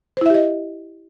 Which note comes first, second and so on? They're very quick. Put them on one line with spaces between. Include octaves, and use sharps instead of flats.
C5 E4 E5 G4 D#5